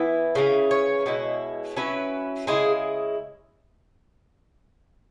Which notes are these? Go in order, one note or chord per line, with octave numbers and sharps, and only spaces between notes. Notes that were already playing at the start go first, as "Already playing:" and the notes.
Already playing: E3 B3 E4
C#3 E3 C#4
C#5
B2 G#3 E4
F#3 C#4 E4 B4
C#3 G#3 E4 G#4